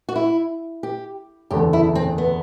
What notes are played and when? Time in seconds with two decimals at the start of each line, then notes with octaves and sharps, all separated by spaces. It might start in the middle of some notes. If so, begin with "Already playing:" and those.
0.09 F#4
0.16 E4
0.83 G4
1.51 F#1 E2 D3 A3 G4
1.73 E4
1.95 C4
2.18 B3